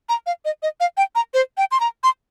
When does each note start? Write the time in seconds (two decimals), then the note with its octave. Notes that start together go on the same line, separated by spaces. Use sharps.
0.09 A#5
0.26 F5
0.45 D#5
0.63 D#5
0.80 F5
0.97 G5
1.15 A#5
1.34 C5
1.57 G5
1.72 C6
1.80 A#5
2.04 C6